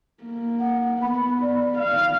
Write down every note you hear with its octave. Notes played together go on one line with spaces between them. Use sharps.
A#3
F#5
B3 B5
D5
F5